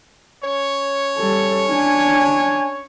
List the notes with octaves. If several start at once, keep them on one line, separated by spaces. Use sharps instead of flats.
C#4 C#5
G3 A4
D4 G#5